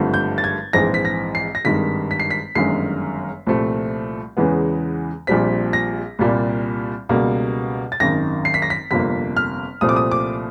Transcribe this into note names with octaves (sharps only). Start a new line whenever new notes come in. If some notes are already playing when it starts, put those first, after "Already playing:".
Already playing: G#1 G2 D3 F3 A3
G6
A6
G#6
A#1 G#2 E3 G#3 C4 A#6
B6
A#6
C7
A#6
G#1 G2 D#3 G#3 B6
B6
C7
B6
G1 F#2 D#3 G#3 C7
C2 A#2 F3 A3 C4
E2 C#3 E3 G#3 B3
A#1 A#2 G3 C4 B6
A#6
C2 A#2 G3 A#3
C#2 B2 G3 A#3
A6
G#1 F#2 D#3 A#6
C7
B6
A#6
B6
G1 F2 C3 F3 A#3 B6
F6
C2 A#2 F3 A3 C4 D#6
D6
D#6
D6